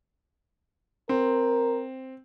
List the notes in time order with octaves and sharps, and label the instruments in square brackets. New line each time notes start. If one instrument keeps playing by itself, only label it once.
[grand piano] C4 [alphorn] A#4